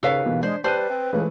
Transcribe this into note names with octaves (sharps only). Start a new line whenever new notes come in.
D#2 C#3 A4 B4 C#5 F5 B6
B2 E3
G#3 D4 C5
G3 B4 C5 A5 F#6 D#7
C4
C#2 E3 G#3 A3